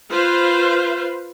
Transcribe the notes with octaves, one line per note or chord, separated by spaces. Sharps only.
F4 B4 C5 F5